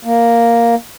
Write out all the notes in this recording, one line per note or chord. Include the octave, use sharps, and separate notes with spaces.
A#3